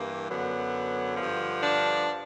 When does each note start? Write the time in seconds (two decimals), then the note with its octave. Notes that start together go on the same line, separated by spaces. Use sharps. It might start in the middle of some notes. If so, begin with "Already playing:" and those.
Already playing: G2 E3 A#3
0.28 F#2 D3 F#3 B3
1.17 G2 D3 F3
1.62 D4